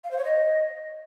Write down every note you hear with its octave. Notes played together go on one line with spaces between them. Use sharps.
F5
C5
C#5
D#5